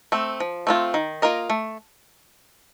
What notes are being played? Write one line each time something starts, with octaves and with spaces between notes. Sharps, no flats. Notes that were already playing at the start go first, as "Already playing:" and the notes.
A3 C4
F3
A3 C4 F4
D#3
A#3 F4 A#4 D#5
A3